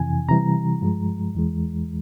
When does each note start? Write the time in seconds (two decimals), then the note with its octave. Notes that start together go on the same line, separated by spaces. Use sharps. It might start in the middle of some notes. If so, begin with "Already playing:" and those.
Already playing: F2 C3 E3 G#5
0.28 C3 E3 G3 A#5
0.82 G2 F3 G#3
1.35 E2 E3 G#3